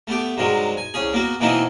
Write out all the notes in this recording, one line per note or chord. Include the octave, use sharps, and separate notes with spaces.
A3 B3 G4
G2 C3 D#3 F#3 G#3
G#5
C2 C#4 G#4
A#3 B3 F#4
B2 E3 A#3 C4 D#4 E4